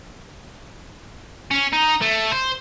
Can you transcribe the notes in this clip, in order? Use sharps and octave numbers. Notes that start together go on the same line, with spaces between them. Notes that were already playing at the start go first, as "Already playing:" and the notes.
C#4
D#4
A3
C5